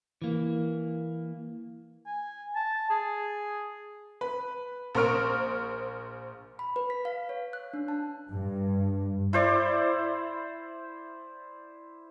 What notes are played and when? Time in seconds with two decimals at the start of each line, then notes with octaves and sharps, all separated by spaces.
0.22 E3 A#3
2.06 G#5
2.56 A5
2.90 G#4
4.21 B4
4.95 A#1 A#4 C5 C#6 F6 D7
6.59 B5
6.76 B4
6.90 B6
7.05 F5
7.29 C#5
7.53 F#6
7.73 D4
7.88 A5
8.30 G2
9.33 E4 C5 D5